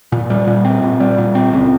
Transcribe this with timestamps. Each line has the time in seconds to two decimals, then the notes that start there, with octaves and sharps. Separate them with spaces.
0.12 A#2
0.30 G3
0.47 A#2
0.65 C4
0.82 A#2
1.00 G3
1.18 A#2
1.35 C4
1.53 C#2